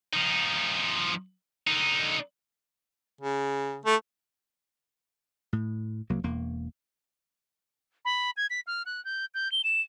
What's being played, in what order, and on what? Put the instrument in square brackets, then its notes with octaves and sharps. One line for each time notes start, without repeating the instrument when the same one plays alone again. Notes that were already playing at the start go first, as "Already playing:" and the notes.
[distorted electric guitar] F3 D#4
D3 D#4
[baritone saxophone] C#3
A3
[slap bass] A2
C2 F#3 A#3
E1 E2 A#3
[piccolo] B5
G#6
B6
F6
F#6
G6
G6
G7
E7